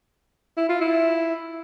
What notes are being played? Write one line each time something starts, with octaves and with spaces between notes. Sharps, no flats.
E4
F4
E4